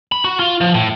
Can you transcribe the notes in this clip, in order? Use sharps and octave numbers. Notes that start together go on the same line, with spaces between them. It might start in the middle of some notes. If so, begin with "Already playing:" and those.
B5
F#4
F4
F3
A2